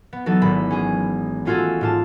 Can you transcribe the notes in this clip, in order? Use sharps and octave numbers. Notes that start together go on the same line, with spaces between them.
B3
E3 F#3 B3 D#4 A4
G#1 B5
C#4 G#4
A3 C#4 F4 F#4 G#4 A4
G#2 F4 A5